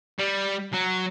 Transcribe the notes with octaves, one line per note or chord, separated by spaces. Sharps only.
G3
F#3